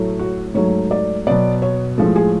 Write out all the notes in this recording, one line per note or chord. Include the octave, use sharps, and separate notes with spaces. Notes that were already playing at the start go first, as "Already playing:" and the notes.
Already playing: A2 F#3 A3
F#4
G#2 F#3 A3 C#5
D5
B2 F#3 B3 D5
C#5
A2 F3 G#3 A4
G#4